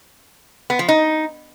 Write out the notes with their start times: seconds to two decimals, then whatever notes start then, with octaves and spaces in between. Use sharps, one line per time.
0.70 B3
0.79 F3
0.89 D#4